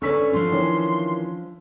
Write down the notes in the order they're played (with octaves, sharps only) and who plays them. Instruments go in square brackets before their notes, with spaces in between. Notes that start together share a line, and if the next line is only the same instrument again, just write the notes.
[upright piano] D3 E6 B6 [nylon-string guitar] C#4 B4 D5 [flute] C#6
[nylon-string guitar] F3 D4 F4 [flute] C6
[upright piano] D#3 E3 C#4